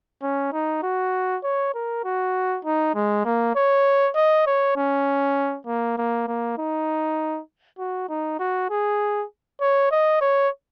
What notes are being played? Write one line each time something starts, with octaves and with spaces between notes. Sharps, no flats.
C#4
D#4
F#4
C#5
A#4
F#4
D#4
G#3
A#3
C#5
D#5
C#5
C#4
A#3
A#3
A#3
D#4
F#4
D#4
F#4
G#4
C#5
D#5
C#5